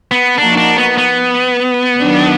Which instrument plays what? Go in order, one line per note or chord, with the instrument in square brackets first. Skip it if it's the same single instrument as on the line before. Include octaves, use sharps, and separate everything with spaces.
[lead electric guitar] B3
[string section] F3 A#3 D#4 F#4 [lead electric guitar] D4
[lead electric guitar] D4
B3
B3
[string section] D#3 F#3 D4